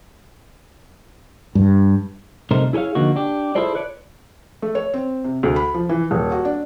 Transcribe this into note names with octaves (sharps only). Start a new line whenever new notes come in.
G2
C2 C3 A3 D#4 A#4 C5
E4 G#4 A4 C#5 F5
D3 F3 A#3 D#4 F#4
D4 G4
E4 F4 G#4 A4 C5 D5
B4 C#5 D5
A3
C#5
C4
C3
D2
B5
F3
E3
D#1
F#4
D4